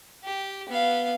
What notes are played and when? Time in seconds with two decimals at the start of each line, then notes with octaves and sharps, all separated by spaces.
0.24 G4
0.69 B3 F5